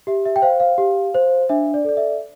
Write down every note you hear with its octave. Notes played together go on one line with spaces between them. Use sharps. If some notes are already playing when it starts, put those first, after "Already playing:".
G4 E5
E5
G5
C5 F5
F5
G4
C5
D4 E5
D5
A4 D5
E5